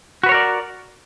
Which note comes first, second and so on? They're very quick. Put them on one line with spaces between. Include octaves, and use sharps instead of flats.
F#4 B4 C#5 A#4 D5